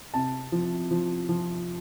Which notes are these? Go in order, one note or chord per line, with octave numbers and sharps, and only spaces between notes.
C3 A5
F3
F3
F3